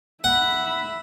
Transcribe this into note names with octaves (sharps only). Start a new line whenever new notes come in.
E5 F#5 B5